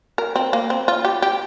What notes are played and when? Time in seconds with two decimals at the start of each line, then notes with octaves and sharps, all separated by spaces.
0.18 A#4
0.36 C4
0.53 A#3
0.70 C4
0.88 F4
1.05 G4
1.22 G4